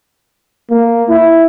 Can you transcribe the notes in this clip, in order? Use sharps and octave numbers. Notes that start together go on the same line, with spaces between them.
A#3
E4